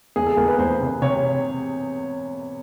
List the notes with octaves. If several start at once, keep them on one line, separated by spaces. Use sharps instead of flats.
E2 G#4
A4
E2 A#4
B4
E2 C5
C3
C3 C#5